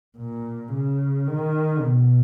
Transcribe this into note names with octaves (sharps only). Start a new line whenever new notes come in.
A#2
C#3
D#3
B2